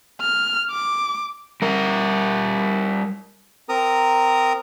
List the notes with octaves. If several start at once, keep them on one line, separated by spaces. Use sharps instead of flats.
F6
D6
G3 A#4
C4 A#4 A#5 D#6